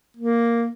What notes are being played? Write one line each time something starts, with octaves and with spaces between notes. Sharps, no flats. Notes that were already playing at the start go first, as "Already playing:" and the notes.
A#3